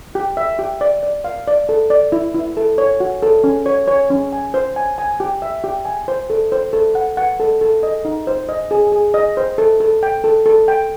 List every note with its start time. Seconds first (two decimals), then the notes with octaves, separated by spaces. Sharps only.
0.15 G4
0.37 E5
0.59 G4
0.81 D5
1.03 D5
1.24 F5
1.48 D5
1.69 A4
1.90 D5
2.12 E4
2.34 E4
2.57 A4
2.78 C#5
3.00 F#4
3.23 A4
3.44 C#4
3.66 C#5
3.88 C#5
4.10 C#4
4.33 G#5
4.54 C5
4.76 G#5
4.98 G#5
5.20 G4
5.42 E5
5.64 G4
5.85 G#5
6.08 C5
6.30 A4
6.52 C5
6.73 A4
6.95 F#5
7.17 F#5
7.40 A4
7.61 A4
7.83 D#5
8.05 D#4
8.27 C5
8.49 D#5
8.71 G#4
8.92 G#4
9.14 D#5
9.37 C5
9.58 A4
9.80 A4
10.03 G5
10.24 A4
10.46 A4
10.68 G5